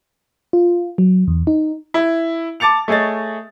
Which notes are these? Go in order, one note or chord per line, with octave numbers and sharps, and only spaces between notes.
F4
F#3
E2
D#4
E4
A5 D6 A6 C#7 F7
A3 G#4 C#5 D#5 A6